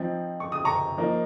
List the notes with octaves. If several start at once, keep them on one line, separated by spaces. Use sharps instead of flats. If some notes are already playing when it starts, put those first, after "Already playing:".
Already playing: F3 C4 D#4
C#6
D#6
A#5 C#6
F3 A#3 D#4